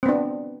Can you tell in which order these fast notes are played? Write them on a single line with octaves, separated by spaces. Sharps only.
C4 B3 D4